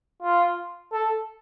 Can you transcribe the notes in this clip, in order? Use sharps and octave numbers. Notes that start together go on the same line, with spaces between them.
F4
A4